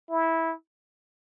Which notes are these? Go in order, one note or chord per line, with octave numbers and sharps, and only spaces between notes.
E4